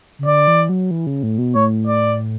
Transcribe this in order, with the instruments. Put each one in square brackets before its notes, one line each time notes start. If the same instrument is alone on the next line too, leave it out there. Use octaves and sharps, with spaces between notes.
[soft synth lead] C#3
[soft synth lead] D3 [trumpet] D5
[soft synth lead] E3
F#3
E3
C#3
A2
B2
[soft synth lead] A2 [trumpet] C#5
[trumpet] D5